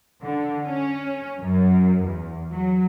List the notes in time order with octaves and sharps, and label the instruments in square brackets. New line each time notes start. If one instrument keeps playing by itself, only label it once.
[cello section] D3
C#4
F#2
E2
F#3